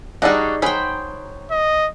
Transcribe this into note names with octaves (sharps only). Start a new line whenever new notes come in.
G3 D4 D#4 F#4 G#4
F#3 G#4 C5 G5 B5
D#5